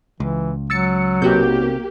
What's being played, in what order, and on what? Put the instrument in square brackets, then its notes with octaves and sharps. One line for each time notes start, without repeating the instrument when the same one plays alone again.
[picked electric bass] C#2 [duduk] E3
[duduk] F#3 [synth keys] E6 A6 C#7
[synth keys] B1 F#4 G6 [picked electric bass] C3 [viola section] A#3 G4